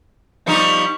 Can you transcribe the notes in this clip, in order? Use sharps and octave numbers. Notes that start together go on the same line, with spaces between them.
F3 G3 D#4 C#6